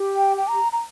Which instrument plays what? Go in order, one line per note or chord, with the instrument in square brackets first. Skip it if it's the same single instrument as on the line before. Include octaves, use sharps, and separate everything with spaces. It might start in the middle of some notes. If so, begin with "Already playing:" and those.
Already playing: [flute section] G4
[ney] G5
G5
A#5
A#5